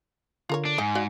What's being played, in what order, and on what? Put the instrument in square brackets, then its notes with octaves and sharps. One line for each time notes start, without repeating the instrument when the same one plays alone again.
[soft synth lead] D3 [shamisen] F4 A#4 C#5
[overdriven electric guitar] D4
[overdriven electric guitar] G#2 [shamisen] D#5 [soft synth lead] G#5
[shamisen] F#4 D5 F5